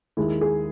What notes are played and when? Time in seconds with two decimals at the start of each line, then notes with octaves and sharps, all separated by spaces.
0.17 D#2 D#3 G#3 E4
0.41 G#4